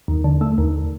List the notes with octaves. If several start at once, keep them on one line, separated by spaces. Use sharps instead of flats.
D#2
D3
A3
D#2